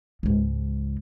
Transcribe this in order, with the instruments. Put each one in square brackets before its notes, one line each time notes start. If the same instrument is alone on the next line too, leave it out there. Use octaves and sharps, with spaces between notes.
[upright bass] C#2 G#2